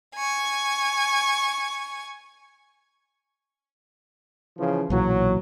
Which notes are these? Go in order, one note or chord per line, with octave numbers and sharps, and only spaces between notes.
G#5 C#6
C#3 E3 F3
B1 A#2 E3 F#3